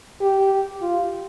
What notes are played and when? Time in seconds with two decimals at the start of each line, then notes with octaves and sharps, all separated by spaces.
0.22 G4
0.82 F4